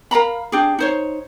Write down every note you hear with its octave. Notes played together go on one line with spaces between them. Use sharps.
A#4 F5 A#5 B5
D4 G4 G#4
D#4 C5 C#5